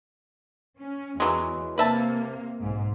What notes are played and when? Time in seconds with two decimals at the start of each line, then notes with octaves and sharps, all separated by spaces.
0.78 C#4
1.20 E2 E3 F#3 G#3
1.78 C3 A#3 B4 E5 A5
2.61 B1 G#2